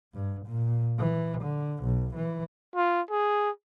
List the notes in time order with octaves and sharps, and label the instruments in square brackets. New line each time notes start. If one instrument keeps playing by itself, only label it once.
[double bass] G2
A#2
E3
D3
B1
E3
[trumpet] F4
G#4